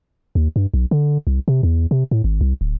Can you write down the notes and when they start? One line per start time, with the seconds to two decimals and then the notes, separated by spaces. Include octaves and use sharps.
0.35 D#2
0.56 G2
0.74 B1
0.91 D3
1.27 C2
1.48 C3
1.63 E2
1.91 C3
2.11 A2
2.24 G#1
2.41 C2
2.61 D1